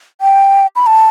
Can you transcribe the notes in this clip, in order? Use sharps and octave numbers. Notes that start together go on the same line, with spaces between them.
G5
B5
A5